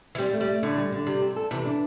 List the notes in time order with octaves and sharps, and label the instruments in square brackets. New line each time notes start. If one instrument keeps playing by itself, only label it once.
[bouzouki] E3
[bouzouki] G3 [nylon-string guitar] C4
[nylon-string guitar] A3
[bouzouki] G3
[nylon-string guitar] A3
[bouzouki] A2 [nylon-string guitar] D3
[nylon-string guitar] G3
D3
[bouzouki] C3 [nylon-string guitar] G3
[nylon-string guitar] C4
A4
[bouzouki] C3 [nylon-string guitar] E3
[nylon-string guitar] D4